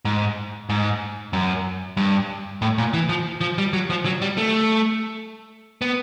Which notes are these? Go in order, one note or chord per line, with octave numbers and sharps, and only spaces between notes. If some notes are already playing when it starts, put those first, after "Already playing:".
G#2
G#2
F#2
G2
A2
A#2
E3
F3
F3
G3
F#3
F3
F#3
G3
A3
B3